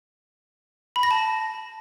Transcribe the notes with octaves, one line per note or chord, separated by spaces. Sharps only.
B5
A#6
A5